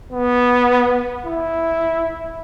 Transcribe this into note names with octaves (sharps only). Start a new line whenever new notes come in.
B3
E4